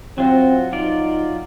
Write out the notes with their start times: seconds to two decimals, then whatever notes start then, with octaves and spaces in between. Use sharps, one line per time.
0.18 F#3 C4 F4 F#4
0.73 F#3 D#4 F4 D5